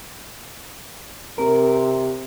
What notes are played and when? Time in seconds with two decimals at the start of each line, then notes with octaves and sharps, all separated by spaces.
1.38 C3 A#4